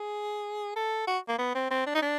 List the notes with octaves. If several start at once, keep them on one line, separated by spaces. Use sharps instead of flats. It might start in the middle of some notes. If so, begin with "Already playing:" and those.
Already playing: G#4
A4
F#4
A#3
B3
C4
C4
D4
D#4
D4